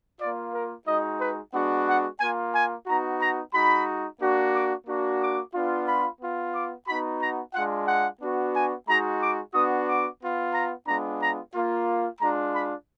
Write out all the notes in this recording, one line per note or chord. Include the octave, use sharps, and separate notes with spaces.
A#3 F4 D5
A#4
G#3 D#4 F#4 D#5
B4
G#3 B3 D4 F#4 F#5
F#5
A#3 F4 G#5
G#5
B3 D#4 F#4 A#5
A#5
G#3 D#4 F#4 B5
A#3 D4 F#4
D6
A#3 D4 F#4
D6
B3 D4 F4
B5
B3 F4
D6
B3 D#4 F#4 B5
A#5
G#3 D4 F4 F#5
F#5
B3 D4 F#4
G#5
G#3 D#4 F#4 A#5
D6
B3 D4 F#4 D#6
D6
B3 F4
A#5
G#3 B3 D4 F4 A#5
A#5
A#3 F4
G#3 D4 F4 A#5
B5